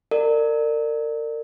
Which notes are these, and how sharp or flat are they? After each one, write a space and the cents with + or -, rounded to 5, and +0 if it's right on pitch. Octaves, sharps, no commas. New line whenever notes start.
A#4 -35 D5 +20